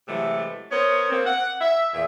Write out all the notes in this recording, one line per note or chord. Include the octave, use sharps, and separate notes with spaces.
C3 E3 F#3 G#3 A3
B3 A#4 C5 C#5
A#3 C4
F#5
E5
E2 A#2 E5